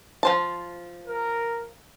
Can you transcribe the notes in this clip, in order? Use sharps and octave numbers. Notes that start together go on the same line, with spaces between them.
F3 C5 A5
A#4